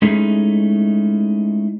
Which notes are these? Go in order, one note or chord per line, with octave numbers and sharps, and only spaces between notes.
G#3 A3 C#4 D#4 E4 G#4